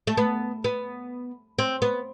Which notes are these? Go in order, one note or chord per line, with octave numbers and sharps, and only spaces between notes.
A3
B3
B3
C4
B3